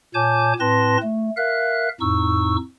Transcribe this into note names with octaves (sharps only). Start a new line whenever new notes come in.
A#2 C#5 G#5 A5 D6 G6
A2 C4 B4 A5 C6 A#6
A3
A#4 E5 F5 F#6
F2 A2 D#4 C#6 E6